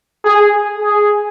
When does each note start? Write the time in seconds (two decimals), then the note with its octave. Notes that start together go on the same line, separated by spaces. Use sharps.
0.24 G#4
0.78 G#4